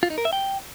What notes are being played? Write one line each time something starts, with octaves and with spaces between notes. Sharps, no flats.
F4
D#4
A#4
E5
G5